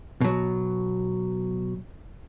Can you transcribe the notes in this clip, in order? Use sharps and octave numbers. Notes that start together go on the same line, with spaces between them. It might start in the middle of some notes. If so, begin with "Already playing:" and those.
B2 F#3